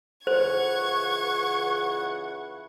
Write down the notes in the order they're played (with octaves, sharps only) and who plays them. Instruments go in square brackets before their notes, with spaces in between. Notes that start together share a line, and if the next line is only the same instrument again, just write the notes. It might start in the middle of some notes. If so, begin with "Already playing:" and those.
[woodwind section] C#2 E3 F#5 [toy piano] C5 [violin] C#6 G#6